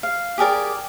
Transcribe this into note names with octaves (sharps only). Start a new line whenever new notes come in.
F5
G4 G#4 A#4 D5